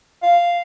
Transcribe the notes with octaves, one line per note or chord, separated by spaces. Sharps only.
F5